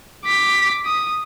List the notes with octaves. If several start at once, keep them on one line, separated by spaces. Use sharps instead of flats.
D6 B6
D#6